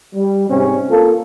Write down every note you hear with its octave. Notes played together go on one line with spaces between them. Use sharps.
G3
G#2 C3 G3 C4 C#4
A#3 F4 A4